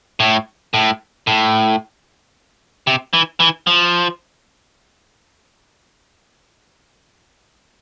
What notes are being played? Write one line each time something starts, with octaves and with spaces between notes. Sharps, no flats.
A2
A2
A2
C3
E3
E3
F3